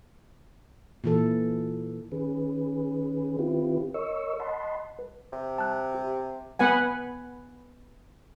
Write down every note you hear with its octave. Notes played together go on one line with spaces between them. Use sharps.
A#2 E3 A4
D#3 C#4 G#4 B4
D#3 C4 E4 F4 G4 B4
A#4 C#5 D#5 C#6 E6
D#5 F#5 A5 B5 C6
B4
C3
A5 F#6
G4
B3 B4 F#5 G#5